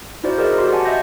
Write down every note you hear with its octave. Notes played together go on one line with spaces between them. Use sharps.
D#4 E4 F#4 C5 D5
F#4 G#4 A#4 C5 D5 D#5
F#4 G4 C6
B4 D5 F#5 G#5 A5
D#5 E5 F#5 G6 A#6